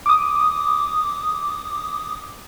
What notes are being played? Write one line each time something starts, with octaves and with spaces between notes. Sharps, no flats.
D6 D#6